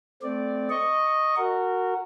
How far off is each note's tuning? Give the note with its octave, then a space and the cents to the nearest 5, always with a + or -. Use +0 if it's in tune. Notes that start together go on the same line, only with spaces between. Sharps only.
A3 -15 C4 -15 D5 +0
D#5 +0 C#6 +0
F#4 +0 A#4 -20